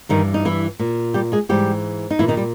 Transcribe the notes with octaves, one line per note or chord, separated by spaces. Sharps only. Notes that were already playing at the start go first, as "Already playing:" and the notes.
G2 D#3 E3 D#4
D#4
E3 E4
A#2
G3 G4
G#3 G#4
G#2 E3 G3 G4
D#4
A#2 E3 E4
D#3 D#4
G3